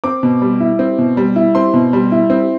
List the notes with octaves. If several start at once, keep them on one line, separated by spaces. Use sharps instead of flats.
C4 D6
B2
G3
E4
C4
B2
G3
E4
C4 C6
B2
G3
E4
C4